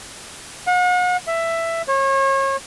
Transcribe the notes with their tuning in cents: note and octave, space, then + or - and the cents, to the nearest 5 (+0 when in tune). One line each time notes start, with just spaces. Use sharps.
F#5 -40
E5 +10
C#5 -35